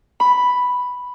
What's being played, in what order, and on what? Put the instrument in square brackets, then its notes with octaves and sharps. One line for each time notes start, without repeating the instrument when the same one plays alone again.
[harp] B5